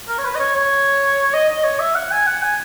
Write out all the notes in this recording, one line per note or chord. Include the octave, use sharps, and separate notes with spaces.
A#4
C#5
B4
D#5
C#5
C#5
D#5
D#5
C#5
E5
F#5
G#5
F#5
G#5